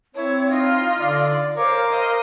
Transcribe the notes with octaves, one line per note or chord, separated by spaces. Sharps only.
C4 E4 C#5
D#4 F4
D3 D5
A#4 C5 C#5 F5 D6
D#5 F5